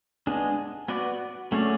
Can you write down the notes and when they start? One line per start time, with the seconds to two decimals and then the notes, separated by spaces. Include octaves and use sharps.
0.27 G#3 B3 D4 G#4
0.88 B3 F#4 B4 D5
1.52 F#3 A3 C#4 G#4 D5